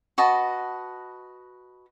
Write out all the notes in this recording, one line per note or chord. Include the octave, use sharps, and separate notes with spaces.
F#4 B4 D#5 A5